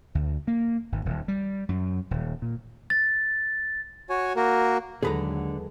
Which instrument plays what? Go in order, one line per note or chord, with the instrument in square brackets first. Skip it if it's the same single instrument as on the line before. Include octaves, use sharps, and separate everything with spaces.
[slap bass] D2
A#3
G#1
D#1
G3
F#2
D#1
A#2
[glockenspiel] A6
[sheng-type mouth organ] F#4 C#5 G#5
A#3 F#4 A#4
[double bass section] D#2 F#3 G#3 [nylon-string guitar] D3 [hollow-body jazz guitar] G#4 B4 A#5